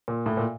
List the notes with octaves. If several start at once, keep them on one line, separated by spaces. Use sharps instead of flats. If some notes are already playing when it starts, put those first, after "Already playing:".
A#2
A2
A#2